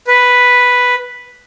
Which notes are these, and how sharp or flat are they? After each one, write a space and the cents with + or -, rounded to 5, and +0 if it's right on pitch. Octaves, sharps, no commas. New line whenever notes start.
B4 +0